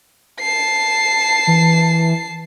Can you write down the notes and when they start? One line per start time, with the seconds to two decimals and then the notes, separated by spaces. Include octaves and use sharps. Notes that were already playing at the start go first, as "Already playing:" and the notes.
0.40 A5 C7
1.47 E3